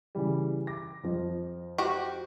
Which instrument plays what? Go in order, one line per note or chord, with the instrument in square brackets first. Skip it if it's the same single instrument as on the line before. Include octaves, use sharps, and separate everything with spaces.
[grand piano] C#3 E3 G3
D6 A#6
F2 F3 D#5
[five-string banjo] F#4 G4